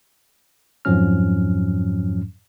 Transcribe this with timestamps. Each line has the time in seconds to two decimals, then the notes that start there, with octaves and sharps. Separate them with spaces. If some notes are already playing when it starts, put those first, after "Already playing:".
0.85 F2 G#2 F3 F#3 C#4 F6